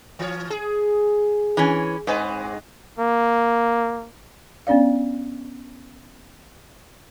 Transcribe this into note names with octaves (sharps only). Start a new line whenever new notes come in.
E3 C#5
G#4
E3 C#4
G#2 G#3 C4 B4
A#3
B3 C#4 D4 D5 F5